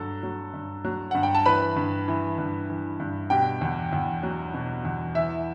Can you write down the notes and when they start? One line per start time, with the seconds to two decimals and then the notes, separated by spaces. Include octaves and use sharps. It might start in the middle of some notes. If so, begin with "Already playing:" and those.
Already playing: G2 F#3 A4
0.23 F#3
0.54 G2
0.84 F#3
1.11 G2 F#5
1.23 G5
1.35 A5
1.46 E3 B4 B5
1.76 G2
2.08 E3
2.38 G2
2.70 E3
3.00 G2
3.30 B2 G4 G5
3.61 E2
3.93 E2
4.23 F#3
4.54 B2
4.85 E2
5.15 E3 E4 E5